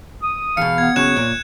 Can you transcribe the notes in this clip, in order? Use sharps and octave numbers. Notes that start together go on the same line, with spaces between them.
D#6
E2 B2 F5 C#7
B3 G#6
C#3 F#3 C#5 F#6 G#6 E7
A#2